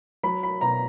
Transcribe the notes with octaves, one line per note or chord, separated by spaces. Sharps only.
F#3 B5
B5
B2 A#5